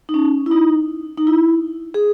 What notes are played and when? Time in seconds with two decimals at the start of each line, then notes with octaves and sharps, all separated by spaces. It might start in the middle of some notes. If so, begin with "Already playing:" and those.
0.09 D#4
0.14 C#4
0.46 E4
0.51 D#4
1.17 D#4
1.27 E4
1.94 G#4